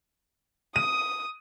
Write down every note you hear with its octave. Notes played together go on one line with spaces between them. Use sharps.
D#6 D#7